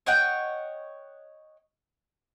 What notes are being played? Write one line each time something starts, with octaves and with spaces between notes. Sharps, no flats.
C#5 D#5 F#5 G5